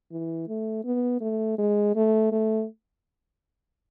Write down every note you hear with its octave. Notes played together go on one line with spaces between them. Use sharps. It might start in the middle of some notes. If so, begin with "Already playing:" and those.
E3
A3
B3
A3
G#3
A3
A3